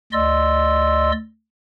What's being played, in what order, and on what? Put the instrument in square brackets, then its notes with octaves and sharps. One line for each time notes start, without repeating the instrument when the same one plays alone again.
[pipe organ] D2 D5 D#5 C6 E6